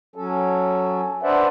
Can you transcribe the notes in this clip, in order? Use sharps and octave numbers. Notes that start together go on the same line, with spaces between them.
F#3 C#4 A4
D4 B4 C5 D5 E5 F#5